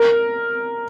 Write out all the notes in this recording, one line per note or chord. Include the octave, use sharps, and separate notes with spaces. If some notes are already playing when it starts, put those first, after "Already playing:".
Already playing: A#4